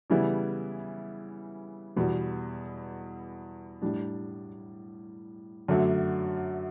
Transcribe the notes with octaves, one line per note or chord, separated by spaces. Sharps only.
C#3 E3 G3 B3 E4
E2 B2 G3
A2 G3 D4
F#2 D3 F#3 A3 D4